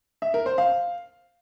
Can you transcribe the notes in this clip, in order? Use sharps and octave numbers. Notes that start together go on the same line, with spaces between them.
E5
A#4
C5
F5